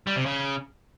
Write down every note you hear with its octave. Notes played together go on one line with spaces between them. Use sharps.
G3
C3
C#3